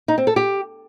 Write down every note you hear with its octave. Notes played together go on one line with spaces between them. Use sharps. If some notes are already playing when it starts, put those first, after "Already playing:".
D#4
C4
A4
G4